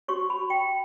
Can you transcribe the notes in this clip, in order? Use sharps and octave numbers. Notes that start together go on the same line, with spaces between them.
F#4 C#5 C#6
B5
G5